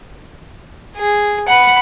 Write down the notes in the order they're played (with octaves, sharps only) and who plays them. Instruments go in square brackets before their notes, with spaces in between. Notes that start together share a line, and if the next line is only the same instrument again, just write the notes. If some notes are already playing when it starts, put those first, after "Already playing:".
[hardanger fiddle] G#4
[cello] F#5 [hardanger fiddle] B5